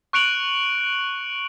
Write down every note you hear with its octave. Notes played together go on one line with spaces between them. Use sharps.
C#6 F#6 C#7 D7 F7 F#7